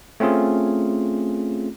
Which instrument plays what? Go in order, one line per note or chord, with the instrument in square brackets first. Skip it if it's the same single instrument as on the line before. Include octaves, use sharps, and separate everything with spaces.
[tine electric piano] A3 C4 C#4 F4 G#4